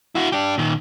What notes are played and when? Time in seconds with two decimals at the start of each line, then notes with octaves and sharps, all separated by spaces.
0.15 E4 F#4
0.32 D4 G4
0.58 A#2 D#3